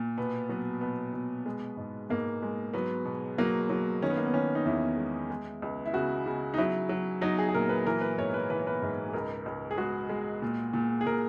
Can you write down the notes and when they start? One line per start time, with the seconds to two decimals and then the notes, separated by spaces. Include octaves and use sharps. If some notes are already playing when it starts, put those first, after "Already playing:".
Already playing: A#2
0.18 B2 B3
0.49 F#3 B3
0.81 B2 B3
1.13 B2
1.46 G#3
1.77 G#2
2.10 G#2 A#3
2.42 G#3
2.73 F#3 B3
3.05 B2
3.38 F#3 A#3
3.70 F#3
4.02 D#3 C#4
4.10 B3
4.17 A#3
4.25 B3
4.33 D#3 C#4
4.55 D#4
4.65 E2 E4
4.97 G#3
5.30 G#3
5.62 C#2
5.86 E4
5.93 C#3 F#4
6.26 C#3
6.54 D#4
6.57 F#3 E4
6.89 F#3
7.21 F#3 D#4
7.39 G#4
7.49 G#4
7.55 A#2 A#4
7.69 B4
7.86 E3 A#4
8.01 B4
8.17 G#2 C#5
8.34 B4
8.50 E3 B4
8.59 C#5
8.67 B4
8.82 G#2
9.08 G#4
9.13 C#2 A#4
9.46 C#2
9.71 G#4
9.77 G#3 F#4
10.09 G#3
10.42 A#2
10.73 A#2
11.01 G#4
11.06 A#2 A#4